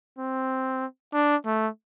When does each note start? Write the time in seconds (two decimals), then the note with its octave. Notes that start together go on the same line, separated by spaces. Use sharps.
0.18 C4
1.14 D4
1.46 A3